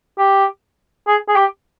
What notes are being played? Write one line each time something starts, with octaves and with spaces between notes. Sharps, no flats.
G4
G#4
G#4
G4